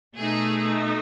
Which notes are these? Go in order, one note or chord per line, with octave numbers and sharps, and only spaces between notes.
B2 A3 D#4 G#4